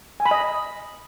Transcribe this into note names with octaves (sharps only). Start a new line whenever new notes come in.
G#5
B5
D#5